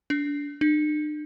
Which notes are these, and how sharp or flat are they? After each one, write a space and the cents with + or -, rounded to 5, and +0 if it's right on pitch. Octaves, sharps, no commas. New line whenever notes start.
D4 -30
D4 +45